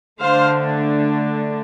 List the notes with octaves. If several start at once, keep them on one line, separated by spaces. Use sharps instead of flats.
D3 A3 D4 C5 F5